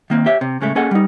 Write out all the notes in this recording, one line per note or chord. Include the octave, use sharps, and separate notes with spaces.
D#3 A#3 C4
G4 C#5 E5
C3
A2 C#3 G#3 A3
A#3 C#4 G#4 A4 D#5 F#5
G3 D#4